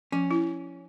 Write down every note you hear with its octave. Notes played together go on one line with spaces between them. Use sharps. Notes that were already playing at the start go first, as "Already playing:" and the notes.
F3 C#4
E4